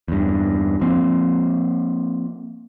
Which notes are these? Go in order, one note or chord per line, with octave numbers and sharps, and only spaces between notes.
E2 G2
F3 A#3 C4